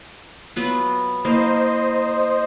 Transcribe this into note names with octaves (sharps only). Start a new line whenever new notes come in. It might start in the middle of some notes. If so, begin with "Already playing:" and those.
F#3 B3 F4
A#3 E4 C5 D#5